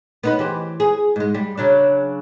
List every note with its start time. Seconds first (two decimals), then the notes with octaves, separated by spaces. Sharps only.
0.23 B3 D#4 B4
0.39 E3 G4 C5
0.80 G#4
1.16 G#2 G#3
1.34 G3
1.58 C#3 F#3 D4